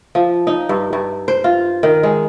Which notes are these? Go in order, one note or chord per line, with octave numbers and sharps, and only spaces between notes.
F3
D#4
G2
G2
C5
F4
D#3
G#3